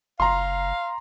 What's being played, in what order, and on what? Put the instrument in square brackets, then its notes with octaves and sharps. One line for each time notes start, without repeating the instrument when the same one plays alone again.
[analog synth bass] F#1 [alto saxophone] F5 [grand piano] A#5 C6